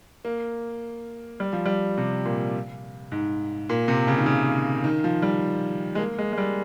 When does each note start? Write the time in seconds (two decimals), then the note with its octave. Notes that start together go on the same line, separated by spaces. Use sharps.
0.25 A#3
1.40 G3
1.53 F3
1.66 G3
1.98 C3
2.25 A#2
3.12 G#2
3.69 A#2
3.88 C3
4.07 C#3
4.18 D#3
4.26 C#3
4.84 D#3
5.04 F3
5.22 G3
5.95 G#3
5.98 A#3
6.18 G#3
6.33 G#3
6.38 G3